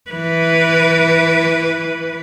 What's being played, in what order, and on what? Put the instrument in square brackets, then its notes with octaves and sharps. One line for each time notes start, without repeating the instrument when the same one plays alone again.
[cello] E3 B4